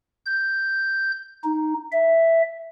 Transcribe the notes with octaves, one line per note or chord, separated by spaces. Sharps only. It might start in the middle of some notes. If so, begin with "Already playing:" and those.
G6
D#4
E5